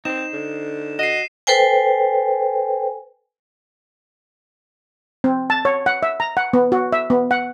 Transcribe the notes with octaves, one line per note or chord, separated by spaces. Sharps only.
C4 D#4 C5 E7
D3
F#4 D#5 C7 D#7 E7
A4 B4 C5 G5 G#5
C4
A5
C#5
F#5
E5
A#5
F#5
B3
F#4
E5
B3
F#5